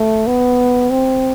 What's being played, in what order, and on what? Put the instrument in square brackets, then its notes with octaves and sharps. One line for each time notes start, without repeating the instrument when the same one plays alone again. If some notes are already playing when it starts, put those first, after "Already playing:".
Already playing: [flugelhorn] A3
B3
C4